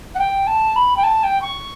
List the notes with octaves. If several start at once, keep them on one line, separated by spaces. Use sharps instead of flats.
F#5
G5
A5
B5
G5
A5
G5
C#6